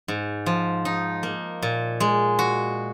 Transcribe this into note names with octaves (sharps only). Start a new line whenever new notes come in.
G#2
F3
D#4
A#3
A#2
G#3
F#4